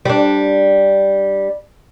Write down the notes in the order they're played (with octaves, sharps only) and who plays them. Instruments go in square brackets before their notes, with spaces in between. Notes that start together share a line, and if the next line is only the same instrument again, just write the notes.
[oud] G3 D4